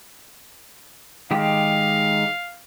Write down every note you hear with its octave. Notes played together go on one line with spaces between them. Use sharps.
D#3 G#3 G4 F5